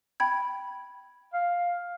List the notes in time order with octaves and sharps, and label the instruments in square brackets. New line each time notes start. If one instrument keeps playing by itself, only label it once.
[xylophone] G5 B5 G#6
[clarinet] F5